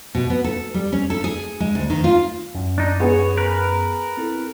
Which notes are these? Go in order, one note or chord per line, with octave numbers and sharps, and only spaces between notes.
B2
B3
A4
G3
C#4
A4
G#4
G#3
D2
D#3
F4
F#2
D4 D#4
B3 G#4 C#5
A#4 B4
C4 E4 A4